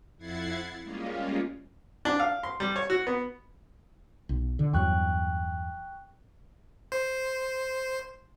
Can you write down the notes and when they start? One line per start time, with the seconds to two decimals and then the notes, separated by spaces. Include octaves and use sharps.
0.17 F2 E4 F#5 G#6 A6 C7
0.82 G3 G#3 A#3 C#4 F4
2.05 D4
2.20 F5
2.43 C6
2.60 G3
2.76 C#5
2.90 F#4
3.07 B3
4.29 B1
4.59 D3
4.73 E2 G2 F#3 G5 C#6 F#6
6.92 C5